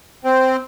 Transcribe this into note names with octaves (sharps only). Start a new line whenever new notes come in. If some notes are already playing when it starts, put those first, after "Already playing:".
C4